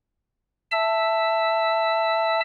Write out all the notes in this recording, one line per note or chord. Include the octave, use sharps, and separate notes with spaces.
E5 A5 E6